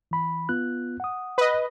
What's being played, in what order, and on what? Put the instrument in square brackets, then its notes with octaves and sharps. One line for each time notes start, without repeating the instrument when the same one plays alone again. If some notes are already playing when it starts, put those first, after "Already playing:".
[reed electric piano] E3 B5
B3 F4 F#6
F#5 D#6
[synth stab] B4 D#5